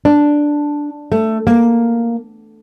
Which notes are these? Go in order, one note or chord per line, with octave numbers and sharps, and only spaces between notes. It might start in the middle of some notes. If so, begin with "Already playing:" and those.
D4
A3
A#3